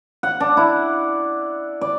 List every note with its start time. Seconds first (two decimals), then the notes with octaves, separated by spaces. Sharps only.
0.23 F#5
0.40 D4
0.57 E4
1.81 D5